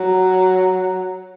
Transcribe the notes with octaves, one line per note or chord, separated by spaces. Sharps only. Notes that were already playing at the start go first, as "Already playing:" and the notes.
Already playing: F#3